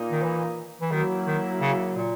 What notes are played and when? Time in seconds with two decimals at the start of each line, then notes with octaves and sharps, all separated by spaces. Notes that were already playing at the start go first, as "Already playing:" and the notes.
Already playing: A#2 A#3 D#4
0.11 D#3
0.23 E3
0.81 E3
0.92 D#3 F#3 A#3 E4
1.27 D#3
1.61 C#3
1.95 A#2